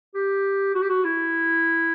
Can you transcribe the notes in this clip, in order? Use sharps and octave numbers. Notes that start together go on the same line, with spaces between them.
G4
F#4
G4
F#4
E4